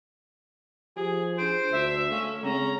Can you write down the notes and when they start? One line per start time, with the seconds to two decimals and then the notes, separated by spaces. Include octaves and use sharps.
0.97 F3 G4 G#4
1.38 D4 G#4 C5 D7
1.72 D2 E5
2.12 A3 C#4 F5
2.43 C#3 G#3 C4 C#4 A#5